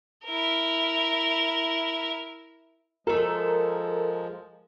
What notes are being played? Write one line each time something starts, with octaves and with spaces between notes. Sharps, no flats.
E4 A#4
F3 G#3 A3 A4 A#4